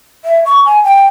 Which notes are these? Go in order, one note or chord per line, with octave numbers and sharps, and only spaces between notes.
E5
C#6
G#5
G5